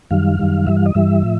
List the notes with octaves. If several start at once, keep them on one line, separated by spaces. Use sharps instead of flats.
F#2 D#3 G3 F5
F#2 D#3 G3
G2 E3 G3 E5
F5
D#5
G2 E3 G3 E5
A2 F3